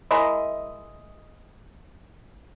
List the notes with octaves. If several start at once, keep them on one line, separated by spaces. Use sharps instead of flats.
G#3 E4 A#4 D#5